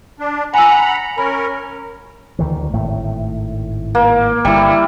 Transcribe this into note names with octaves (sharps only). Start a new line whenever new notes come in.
D4
F#5 G#5 A#5 B5 E6
C#4 A#4 B5
D2 D#3 E3
G#1 A2 A3
A#3
G1 G3 E4